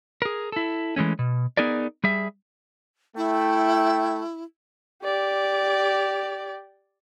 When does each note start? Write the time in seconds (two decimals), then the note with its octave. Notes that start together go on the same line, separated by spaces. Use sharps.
0.22 G#4 A#4
0.52 E4 A4
0.96 E3 G#3 A3 C#4
1.19 B2
1.57 B3 D#4 G#4 A#4 D5
2.04 G3 G#4 E5
3.17 A3 E4 G5
5.04 G4 D5